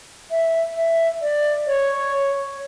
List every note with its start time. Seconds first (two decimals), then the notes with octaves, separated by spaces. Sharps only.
0.31 E5
0.77 E5
1.21 D5
1.67 C#5